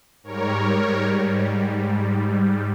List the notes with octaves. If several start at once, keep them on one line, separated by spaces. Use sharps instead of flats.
G#2 G3 A#4 C#5